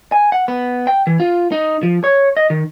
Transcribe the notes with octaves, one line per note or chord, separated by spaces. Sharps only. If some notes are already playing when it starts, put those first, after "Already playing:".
G#5
F#5
B3
G5
E3
F4
D#4
F3
C#5
D#5
D#3